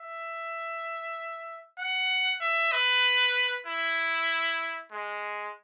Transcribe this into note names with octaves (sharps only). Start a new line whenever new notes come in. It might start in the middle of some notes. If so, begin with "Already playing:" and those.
Already playing: E5
F#5
E5
B4
E4
G#3